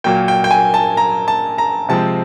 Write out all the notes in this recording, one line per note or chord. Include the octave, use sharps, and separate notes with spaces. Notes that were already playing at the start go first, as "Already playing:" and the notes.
A#2 F#3 A#3 G5
G5
G5
G#5
A5
A#5
A5
A#5
C3 F3 G#3 C4 A5